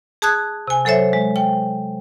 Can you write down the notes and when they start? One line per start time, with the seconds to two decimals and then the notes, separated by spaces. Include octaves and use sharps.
0.22 G#4 A5 D#6 F#6 G#6
0.68 C3 G#5
0.85 F#3 A4 C5 C#5 E5
1.13 G#3
1.36 G5